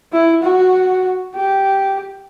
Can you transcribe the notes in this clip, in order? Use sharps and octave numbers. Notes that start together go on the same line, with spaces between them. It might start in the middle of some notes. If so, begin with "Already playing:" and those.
E4
F#4
G4